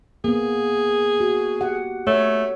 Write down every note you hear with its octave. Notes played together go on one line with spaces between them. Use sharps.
A#3 B3 G#4
F#4
G4 F#5
A3 C#5